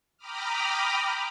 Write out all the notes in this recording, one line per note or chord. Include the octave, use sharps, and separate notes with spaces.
G5 A#5 B5 D6 D#6 F6